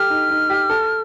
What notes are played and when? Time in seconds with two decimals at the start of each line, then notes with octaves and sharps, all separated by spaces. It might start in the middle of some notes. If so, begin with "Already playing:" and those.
Already playing: G4 A4 F6
0.10 D#4
0.31 D#4
0.50 G4
0.70 A4